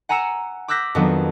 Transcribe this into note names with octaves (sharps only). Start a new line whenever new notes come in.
F#5 G#5 A#5 E6 C#7 E7
D6 E6 F#6 G6 A#6 B6
F2 D#3 F#3 B3 D4